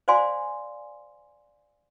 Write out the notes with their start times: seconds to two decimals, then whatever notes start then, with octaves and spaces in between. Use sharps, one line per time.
0.08 C5 D5 F5 G#5 C6